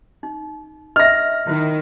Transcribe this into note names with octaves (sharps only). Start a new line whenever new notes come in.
D#4
D#5 E5 F6 A#6
D#3 E4 F4 C5